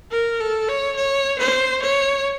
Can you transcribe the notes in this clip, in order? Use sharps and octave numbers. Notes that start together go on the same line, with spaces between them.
A#4
A4
C#5
C#5
C5
C#5